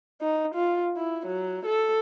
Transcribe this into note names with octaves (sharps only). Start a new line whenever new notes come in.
D#4
F4
E4
F#3
A4